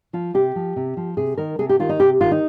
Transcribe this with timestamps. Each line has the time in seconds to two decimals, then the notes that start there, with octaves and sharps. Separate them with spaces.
0.13 F3 F4
0.34 C3 G4
0.56 F3
0.76 C3
0.97 F3
1.17 C3 G#4
1.37 D#3 A#4
1.59 C3 G#4
1.69 G4
1.79 D#3 F4
1.89 D#4
2.00 C3 G4
2.21 D#3 F4
2.31 D#4